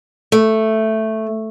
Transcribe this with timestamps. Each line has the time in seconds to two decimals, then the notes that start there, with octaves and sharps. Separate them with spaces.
0.32 A3